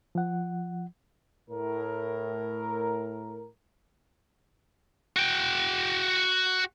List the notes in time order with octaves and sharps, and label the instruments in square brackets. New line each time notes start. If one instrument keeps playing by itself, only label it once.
[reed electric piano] F3 F#5
[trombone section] A2 A#4
[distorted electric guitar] F#4 G5